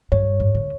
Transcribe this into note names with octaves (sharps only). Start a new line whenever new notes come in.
G2 C#5
G#2
D3